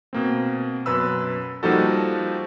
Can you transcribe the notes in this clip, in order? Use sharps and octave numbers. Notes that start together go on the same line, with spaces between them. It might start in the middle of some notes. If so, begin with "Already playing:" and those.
B2 A#3 C4
F#2 B2 B4 B5 E6
F3 G3 A#3 D#4 F#4 A4